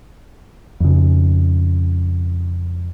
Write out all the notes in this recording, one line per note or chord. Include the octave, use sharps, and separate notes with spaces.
F2 C#3